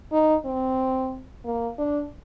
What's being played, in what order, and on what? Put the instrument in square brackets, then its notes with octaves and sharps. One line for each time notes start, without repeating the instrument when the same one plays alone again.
[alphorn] D#4
C4
A#3
D4